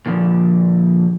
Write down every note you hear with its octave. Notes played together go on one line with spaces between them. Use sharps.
A#2 D3 F3